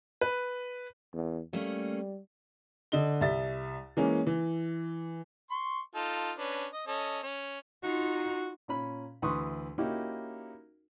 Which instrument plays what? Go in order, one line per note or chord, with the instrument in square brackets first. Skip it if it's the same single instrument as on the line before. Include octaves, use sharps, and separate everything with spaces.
[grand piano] B4
[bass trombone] E2
[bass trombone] G3 [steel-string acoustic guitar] A3 A#3 C#4
[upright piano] D3 D#5 G7
C2 E5 A6
E3 G#3 A#3 C#4
E3
[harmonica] C6 C#6
D#4 F4 A4
C#4 D4 B4
D#5
C#4 A4 D#5
C#4
[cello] D#4 F4 [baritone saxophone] F#4
[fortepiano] A#2 C#4 B5
D2 E3 B4 C6 C#6 D#6
A#3 C#4 D#4 E4 F#4 G4